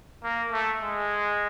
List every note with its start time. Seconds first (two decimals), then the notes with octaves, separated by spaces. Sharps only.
0.24 A#3
0.52 A3
0.81 G#3